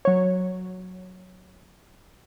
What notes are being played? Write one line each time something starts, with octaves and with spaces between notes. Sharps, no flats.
F#3 C#5